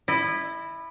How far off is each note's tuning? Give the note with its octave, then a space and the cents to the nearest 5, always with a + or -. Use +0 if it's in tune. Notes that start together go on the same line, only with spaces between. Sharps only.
E4 +0 D#5 -45